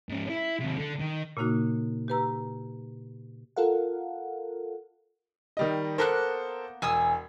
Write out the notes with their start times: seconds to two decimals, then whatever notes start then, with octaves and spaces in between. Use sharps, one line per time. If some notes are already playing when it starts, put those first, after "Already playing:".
0.09 G#2 C#4
0.30 E4
0.60 D#2 C3
0.78 D3
1.01 D#3
1.37 A#2 C#3 A#3 D#4 F#4
2.08 G4 B4 A#5 E6
3.56 F4 A4 A#4 F5 F#5
5.57 D#3 G3 D#5
5.98 A#3 B3 A4 A#4 C5 F#6
6.82 E1 G#5 D#6 E6